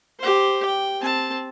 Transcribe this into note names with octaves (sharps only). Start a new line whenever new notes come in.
G4 C5
G5
C4 A5